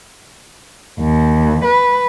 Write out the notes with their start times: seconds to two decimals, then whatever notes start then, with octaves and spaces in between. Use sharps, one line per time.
1.00 D#2
1.64 B4